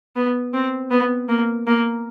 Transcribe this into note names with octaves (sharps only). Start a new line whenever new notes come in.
B3
C4
B3
A#3
A#3